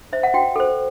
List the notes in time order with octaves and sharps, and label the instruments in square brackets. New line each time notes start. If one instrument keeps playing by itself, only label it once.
[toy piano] C5 E5
F#5
F#4 G5
A4 C5